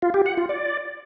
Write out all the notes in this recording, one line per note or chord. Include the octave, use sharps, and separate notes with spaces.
F4
G4
F#5
F4
D5